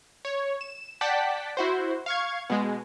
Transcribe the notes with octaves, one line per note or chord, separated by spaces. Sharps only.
C#5
E7
D5 F#5 G5 A5 B6
E4 F#4 C5
F5 C#6 G#6
B2 G#3